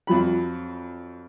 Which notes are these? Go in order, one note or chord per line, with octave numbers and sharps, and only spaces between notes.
F2 F#3 B5